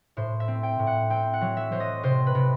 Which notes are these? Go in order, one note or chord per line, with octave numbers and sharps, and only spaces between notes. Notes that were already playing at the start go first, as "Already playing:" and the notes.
A2 C5
E5
C4
G5
A2
F#5
C4 G5
F#5
F#3
E5
F#3 C5
D#5
C3 C5
B4
C3